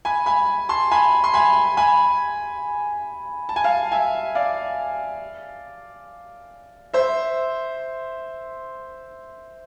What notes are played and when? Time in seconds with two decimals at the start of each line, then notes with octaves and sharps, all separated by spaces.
0.05 G#5 B5
0.26 G#5 B5
0.69 A5 C6
0.91 G#5 B5
1.24 C6
1.34 G#5 B5
1.77 G#5 B5
3.49 A5
3.56 G#5
3.64 F5 A5
3.92 E5 G#5
4.35 D5 F5
6.94 C5 E5